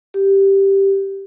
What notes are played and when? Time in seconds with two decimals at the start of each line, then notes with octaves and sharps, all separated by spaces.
0.14 G4